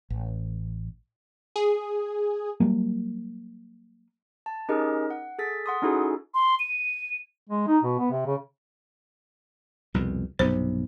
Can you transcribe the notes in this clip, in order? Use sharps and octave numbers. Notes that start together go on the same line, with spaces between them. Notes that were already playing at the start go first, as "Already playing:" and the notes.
A1
G#4
F#3 G3 A#3
A5
C#4 D#4 G4 G#4 A#4 D#5
F#5
G#4 A4 A6 B6
F#5 C6 D#6
C#4 D#4 E4 F#4 G#4 A4
C6
D#7
G#3
D#4
B2
B3
C3
C#3
C2 F2 B2
B1 G2 C3 C5